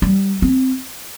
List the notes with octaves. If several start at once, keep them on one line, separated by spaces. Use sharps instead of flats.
G3
C4